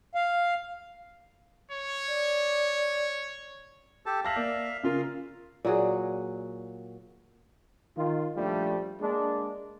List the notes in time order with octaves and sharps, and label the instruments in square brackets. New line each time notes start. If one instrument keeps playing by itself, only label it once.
[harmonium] F5
[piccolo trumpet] C#5
[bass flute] D5
[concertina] G4 A4 A5
[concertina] E5 F5 [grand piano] A5 A#6 F#7
[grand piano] A#3 D5
[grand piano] C#3 F4 A#4 [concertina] F5
[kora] A#2 F#3 F#4 G#4
[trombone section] D#3 F4
A#1 F3 G3 A3 D4
G#3 A#3 D4